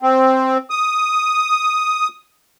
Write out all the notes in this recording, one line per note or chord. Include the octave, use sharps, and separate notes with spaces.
C4
D#6